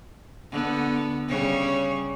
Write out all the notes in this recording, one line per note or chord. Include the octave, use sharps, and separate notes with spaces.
D3 B3
C#3 G3 C#5